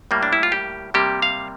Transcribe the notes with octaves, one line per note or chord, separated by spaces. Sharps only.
A2 G3 A#3
D4
E4
F4
G4
C3 G3 A#3 G4
F5